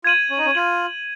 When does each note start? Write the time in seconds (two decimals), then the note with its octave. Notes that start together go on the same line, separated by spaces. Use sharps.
0.04 F4 G#6 D#7 F#7
0.30 C#4
0.38 D#4
0.46 C#4
0.55 F4 G#6 D#7 F#7